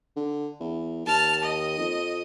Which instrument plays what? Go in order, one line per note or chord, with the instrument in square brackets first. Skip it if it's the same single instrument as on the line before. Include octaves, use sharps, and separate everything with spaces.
[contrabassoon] D3
E2
[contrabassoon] D#2 [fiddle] A5 F6
[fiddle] D#5
[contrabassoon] F2